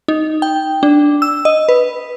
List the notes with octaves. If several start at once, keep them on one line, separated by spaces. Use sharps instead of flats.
D#4
G5
D4
E6
D#5
B4